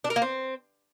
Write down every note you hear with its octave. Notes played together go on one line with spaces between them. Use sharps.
D4
A#4
A#3
C4